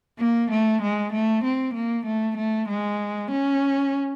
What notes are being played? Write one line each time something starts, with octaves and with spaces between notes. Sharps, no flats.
A#3
A3
G#3
A3
C4
A#3
A3
A3
G#3
C#4